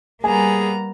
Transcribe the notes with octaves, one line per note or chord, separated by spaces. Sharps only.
G3 A#3 B3 G#4 G#5 A#5